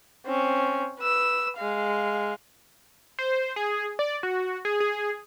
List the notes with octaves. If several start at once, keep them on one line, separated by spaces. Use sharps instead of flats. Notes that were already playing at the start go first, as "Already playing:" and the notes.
C4 C#4
B4 E6
G#3 F5
C5
G#4
D5
F#4
G#4
G#4